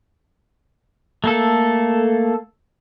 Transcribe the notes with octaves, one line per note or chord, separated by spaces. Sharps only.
A3 A#3 A4